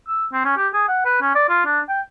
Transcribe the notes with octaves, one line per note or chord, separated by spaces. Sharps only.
E6
C4
C#4
G4
G#4
F#5
B4
C#4
D5
F4
D4
G5